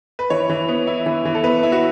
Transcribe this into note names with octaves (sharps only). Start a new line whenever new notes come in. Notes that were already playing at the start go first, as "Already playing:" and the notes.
B4
E3 C#5
E3
B3
E4
E3
E3
A4
B3 B4
E4
F#4